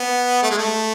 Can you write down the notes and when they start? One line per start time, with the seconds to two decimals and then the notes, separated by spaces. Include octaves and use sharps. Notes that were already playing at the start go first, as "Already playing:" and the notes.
Already playing: B3
0.43 A3
0.50 G#3
0.58 A3